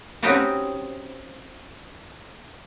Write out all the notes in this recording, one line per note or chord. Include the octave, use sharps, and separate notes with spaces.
C4 C#4 D#4 F#4 G4 B4